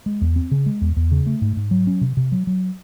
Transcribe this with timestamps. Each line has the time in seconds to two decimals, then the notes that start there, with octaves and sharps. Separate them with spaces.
0.06 G#3
0.21 E2
0.36 C4
0.51 C#3
0.66 G#3
0.81 E2
0.97 E2
1.11 C#3
1.26 A3
1.42 G#2
1.57 G#2
1.71 F#3
1.87 C#4
2.01 C3
2.17 C3
2.32 F#3
2.47 F#3